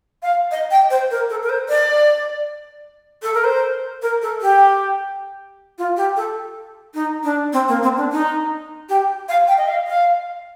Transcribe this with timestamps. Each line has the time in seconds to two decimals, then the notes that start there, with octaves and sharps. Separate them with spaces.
0.23 F5
0.51 D#5
0.71 G5
0.90 C5
1.11 A#4
1.30 A4
1.43 A#4
1.49 C5
1.69 D5
3.23 A4
3.34 A#4
3.44 C5
4.02 A#4
4.22 A4
4.41 G4
5.78 F4
5.97 G4
6.16 A4
6.94 D#4
7.24 D4
7.53 C4
7.68 A#3
7.83 C4
7.97 D4
8.12 D#4
8.89 G4
9.29 F5
9.48 G5
9.58 D#5
9.68 F5
9.87 F5